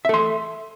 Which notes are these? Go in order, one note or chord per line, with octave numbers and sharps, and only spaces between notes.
A4 E5 C6